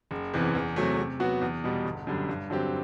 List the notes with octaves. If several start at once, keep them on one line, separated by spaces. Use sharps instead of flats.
F#1
E2 C3 E3
E2
C3 F#3 A3
C3
F#3 B3 F#4
E2
B2 G3
G1
F#2 D3 G3
G2
D3 F#3 C4 G4